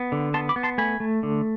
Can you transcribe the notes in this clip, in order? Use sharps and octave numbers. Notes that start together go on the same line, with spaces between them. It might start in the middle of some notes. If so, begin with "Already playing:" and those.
Already playing: B3
D3
B3 A5 C6
B5 D6
B3
A5 C6
A3 G#5 B5
A3
D3